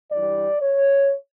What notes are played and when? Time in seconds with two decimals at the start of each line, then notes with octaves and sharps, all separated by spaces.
0.12 G2 E3 G3 D5
0.61 C#5